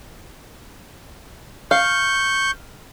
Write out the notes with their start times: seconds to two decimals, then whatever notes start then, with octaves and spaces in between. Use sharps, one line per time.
1.71 F5 C#6 G6